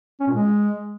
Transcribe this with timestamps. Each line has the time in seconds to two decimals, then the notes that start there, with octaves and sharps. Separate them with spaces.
0.20 C#4
0.27 A#2
0.34 G#3